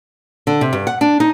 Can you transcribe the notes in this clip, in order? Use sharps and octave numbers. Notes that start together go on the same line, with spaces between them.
D3
C3
G2
F#5
D4
D#4